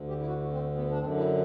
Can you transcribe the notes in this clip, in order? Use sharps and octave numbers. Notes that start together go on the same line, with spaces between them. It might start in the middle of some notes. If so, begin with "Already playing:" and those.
Already playing: D2 D3
G4
E4
F#4
C4
B3
D4
F#2 D3 C4
E4